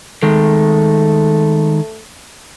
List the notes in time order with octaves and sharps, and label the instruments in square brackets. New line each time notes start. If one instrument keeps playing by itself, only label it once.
[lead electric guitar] D#3 G#3 [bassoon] A3